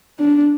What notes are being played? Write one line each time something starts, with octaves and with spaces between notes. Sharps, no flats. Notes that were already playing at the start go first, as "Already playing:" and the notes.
D4